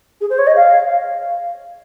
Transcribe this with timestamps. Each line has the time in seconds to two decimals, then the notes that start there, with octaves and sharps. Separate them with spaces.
0.21 G#4
0.30 C5
0.38 C#5
0.47 D#5
0.56 F5